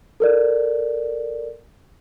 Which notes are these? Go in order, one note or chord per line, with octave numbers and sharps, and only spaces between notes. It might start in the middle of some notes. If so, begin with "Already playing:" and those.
A4 A#4 D5